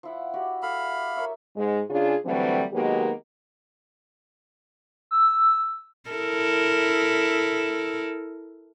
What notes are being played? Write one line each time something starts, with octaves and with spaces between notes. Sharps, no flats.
F3 E4 F#5
F#4 G4 D5
A4 F5 B5
A#4 C#5 E5
G#2 G#3
C#3 D4 F4 G#4
D3 E3 F#3 G3 A3 C4
D#3 F#3 G#3 A#3 B3 G4
E6
E4 A4 A#4